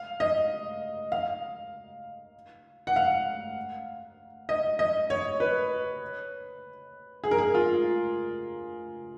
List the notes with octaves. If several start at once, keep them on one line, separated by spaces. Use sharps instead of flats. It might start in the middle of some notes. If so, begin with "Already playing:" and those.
Already playing: F5
D#5
F5
F#5
F5
D#5
D#5
C#5
B4
G#4
A#4
G#4
F4